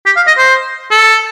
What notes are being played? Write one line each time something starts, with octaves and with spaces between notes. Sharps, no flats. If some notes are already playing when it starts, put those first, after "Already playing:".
G4
F5
D#5
C5
A4